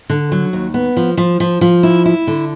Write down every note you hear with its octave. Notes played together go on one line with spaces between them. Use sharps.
D3
F#3
D#2
B3
F3
F3
F3
F3
E4
E4
D3